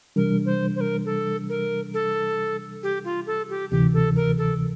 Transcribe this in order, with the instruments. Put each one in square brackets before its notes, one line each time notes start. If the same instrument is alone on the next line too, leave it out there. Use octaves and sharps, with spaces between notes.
[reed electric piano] C3 E3 G3 D4 [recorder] A#4
[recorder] C5
C5
A#4
A4
A#4
A4
G4
F4
A4
G4
[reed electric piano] D2 C3 E3 [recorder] G4
[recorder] A4
A#4
A4